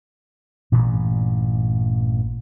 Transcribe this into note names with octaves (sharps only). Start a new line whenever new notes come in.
A1 G2 A#2 E3